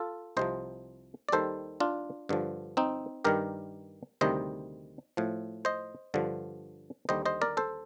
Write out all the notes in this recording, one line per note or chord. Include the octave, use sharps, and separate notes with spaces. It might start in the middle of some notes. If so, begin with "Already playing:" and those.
Already playing: F4 A4
C2 C3 F3 C5 D#5
D5
D#2 D#3 G3 A4 C5
D4 F4
G2 D3 F3
C4 D#4
G2 D#3 G3 G4 A#4
D2 C3 D#3 G3 C5 D#5
A2 F3
C5 D#5
G2 D3 F3
D#2 D3 G3 C5 D#5
C5 D#5
A#4 D5
A4 C5